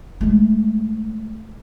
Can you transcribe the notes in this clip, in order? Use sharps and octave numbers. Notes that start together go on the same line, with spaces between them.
G#3 A3